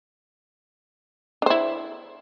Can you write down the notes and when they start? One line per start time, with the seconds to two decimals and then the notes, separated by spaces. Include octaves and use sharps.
1.42 D4
1.46 C5
1.50 E4